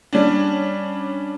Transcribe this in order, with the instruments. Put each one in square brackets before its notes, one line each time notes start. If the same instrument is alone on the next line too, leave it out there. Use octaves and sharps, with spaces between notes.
[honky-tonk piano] G3 C#4 D4